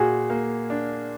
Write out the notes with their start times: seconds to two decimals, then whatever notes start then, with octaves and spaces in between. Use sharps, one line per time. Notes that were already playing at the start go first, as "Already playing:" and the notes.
Already playing: A#2 F#4 G#4
0.30 A#3
0.70 D4